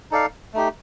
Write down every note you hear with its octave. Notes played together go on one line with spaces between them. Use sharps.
D#4 A4 D5 F5
A3 D#4 G4